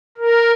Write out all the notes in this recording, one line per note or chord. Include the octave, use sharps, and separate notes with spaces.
A#4